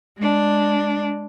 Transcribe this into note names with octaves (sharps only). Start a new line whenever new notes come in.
G#3 D4